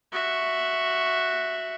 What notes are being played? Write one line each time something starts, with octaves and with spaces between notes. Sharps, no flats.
F#4 E5